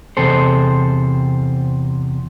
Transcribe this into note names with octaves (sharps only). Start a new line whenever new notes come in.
E2 C3 A4 C5